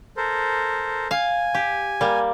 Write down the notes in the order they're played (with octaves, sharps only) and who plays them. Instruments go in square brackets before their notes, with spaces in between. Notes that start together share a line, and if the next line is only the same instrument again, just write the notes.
[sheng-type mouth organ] A4 A#4 C5
[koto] F5 [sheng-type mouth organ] G#5
[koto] G4
G3 A#3